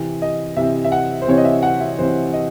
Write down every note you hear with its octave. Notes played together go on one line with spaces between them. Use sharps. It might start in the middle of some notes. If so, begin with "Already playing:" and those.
Already playing: C3 E3 C4
D#5
C3 E3 C4 E5
E5
F#5
C5
C3 E3 C4 C#5
D#5
E5
F#5
E5
C3 E3 C4 C5
D#5